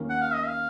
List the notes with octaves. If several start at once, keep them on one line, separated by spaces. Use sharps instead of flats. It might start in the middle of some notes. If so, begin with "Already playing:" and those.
Already playing: D#2 D#3 A#3 C#4
F#5
F5
D#5
F5